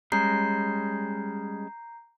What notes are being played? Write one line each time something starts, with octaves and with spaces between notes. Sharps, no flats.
G3 G#3 C#4 A#5 G6 C7